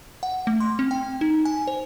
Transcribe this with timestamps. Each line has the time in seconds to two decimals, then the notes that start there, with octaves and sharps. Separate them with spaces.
0.23 F#5
0.47 A3
0.60 C6
0.79 C4
0.91 G5
1.21 D#4
1.45 G#5
1.67 C5